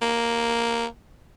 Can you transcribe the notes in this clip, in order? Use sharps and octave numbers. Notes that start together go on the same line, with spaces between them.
A#3